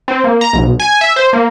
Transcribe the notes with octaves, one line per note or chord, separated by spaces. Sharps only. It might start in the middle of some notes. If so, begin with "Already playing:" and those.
C4
A#3
A#5
B1
G#5
E5
C5
A#3